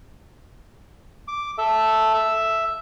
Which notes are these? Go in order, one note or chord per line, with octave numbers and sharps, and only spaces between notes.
D6
A4 E5
E5